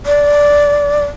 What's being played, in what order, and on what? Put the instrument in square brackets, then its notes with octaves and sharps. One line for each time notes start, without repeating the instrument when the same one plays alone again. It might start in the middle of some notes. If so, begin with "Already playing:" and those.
[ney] D5